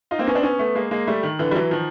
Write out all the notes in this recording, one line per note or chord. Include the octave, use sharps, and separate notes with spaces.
D#4 F4
A#3 C4
B3 C#4
C4 D4
B3 C#4
A3 B3
G#3 A#3
G#3 A#3
G3 A3
D#3
D3 E3
G3
E3 F#3
D#3 F3